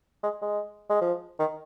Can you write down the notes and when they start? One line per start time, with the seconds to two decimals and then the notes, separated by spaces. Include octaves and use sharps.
0.23 G#3
0.42 G#3
0.90 G#3
1.01 F3
1.39 D#3